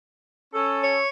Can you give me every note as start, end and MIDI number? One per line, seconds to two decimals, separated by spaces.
0.54 0.97 61
0.54 0.97 69
0.84 1.09 73